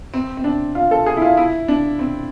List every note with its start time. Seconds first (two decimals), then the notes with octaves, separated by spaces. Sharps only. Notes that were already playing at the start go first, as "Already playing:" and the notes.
0.14 C4
0.37 C4
0.44 D4
0.75 F4
0.91 A4
1.06 G#4
1.17 E4
1.22 F4
1.37 E4
1.68 D4
1.99 C4